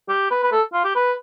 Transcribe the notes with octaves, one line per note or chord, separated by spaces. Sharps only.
G4
B4
B4
A4
F4
G4
B4